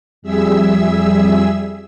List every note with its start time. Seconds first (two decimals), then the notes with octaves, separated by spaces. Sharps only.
0.22 F2 G3 G#4 E5 E6